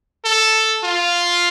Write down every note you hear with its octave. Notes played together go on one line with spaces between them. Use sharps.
A4
F4